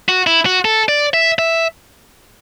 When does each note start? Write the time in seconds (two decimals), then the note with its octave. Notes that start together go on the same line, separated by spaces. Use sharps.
0.09 F#4
0.27 E4
0.46 F#4
0.65 A4
0.89 D5
1.14 E5
1.39 E5